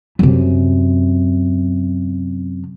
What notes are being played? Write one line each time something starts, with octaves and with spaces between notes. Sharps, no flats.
F#2 C3